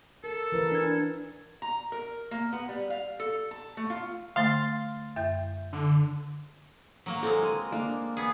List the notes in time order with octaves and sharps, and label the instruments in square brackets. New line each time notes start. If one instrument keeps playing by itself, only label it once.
[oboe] A4 [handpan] A#4
[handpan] E3 A#4 B4
[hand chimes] D4 G#6
[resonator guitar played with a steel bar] A#5
A#4
A#3
B3
G3
F5
A4
A5
A3
F4
[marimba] D3 A3 [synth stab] F5 C6 A6
[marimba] F#2 E5 G6
[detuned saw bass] D3
[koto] F#3 A#3
[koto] G#3 C4 [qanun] A4
[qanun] A#4 G#5
A#3 D4
[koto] B3 G#4